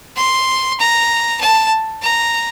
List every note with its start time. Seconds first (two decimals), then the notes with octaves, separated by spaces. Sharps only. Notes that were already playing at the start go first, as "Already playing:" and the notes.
0.17 C6
0.79 A#5
1.41 A5
2.02 A#5